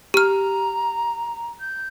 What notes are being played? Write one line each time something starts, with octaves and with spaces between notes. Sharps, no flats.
G4 A#5 F6
G6